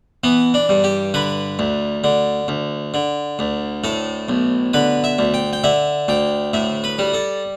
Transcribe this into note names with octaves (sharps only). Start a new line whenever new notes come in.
E3 B3
D4
G2
G4
D3 B4
D2
D3
D2
D3
D2
A2 A4
B1
D3 B4
E5
D2
G5
G5
D3 E5
D2 G5
A2 E5
B4
G3
A4